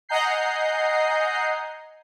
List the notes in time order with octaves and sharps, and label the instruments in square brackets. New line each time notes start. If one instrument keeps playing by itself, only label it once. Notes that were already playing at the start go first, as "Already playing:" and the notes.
[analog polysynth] D#5 F#5 G#5 A#5 G6 C7